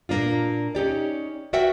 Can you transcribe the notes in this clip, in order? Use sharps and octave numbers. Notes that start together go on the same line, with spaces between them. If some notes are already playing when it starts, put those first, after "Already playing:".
A#2 A#3 D4 F4
C#4 D#4 G4 D5
F#4 A#4 D5 E5 F#5 G5